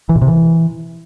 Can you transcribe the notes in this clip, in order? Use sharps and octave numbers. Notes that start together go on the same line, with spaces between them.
E3
A#2
C3
E3